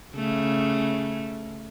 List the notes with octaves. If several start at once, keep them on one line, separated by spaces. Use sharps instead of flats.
C#3 A3